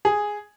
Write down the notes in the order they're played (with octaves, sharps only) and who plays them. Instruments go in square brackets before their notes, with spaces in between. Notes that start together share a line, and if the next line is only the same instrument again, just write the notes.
[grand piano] G#4